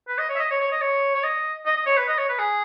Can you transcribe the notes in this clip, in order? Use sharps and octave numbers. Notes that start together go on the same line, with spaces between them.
B4
D#5
C#5
E5
D#5
C#5
C#5
D#5
C#5
C#5
D#5
D#5
D#5
C#5
B4
D#5
C#5
B4
G#4